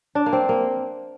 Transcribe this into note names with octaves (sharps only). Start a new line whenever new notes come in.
D4
A#3
C4
A#3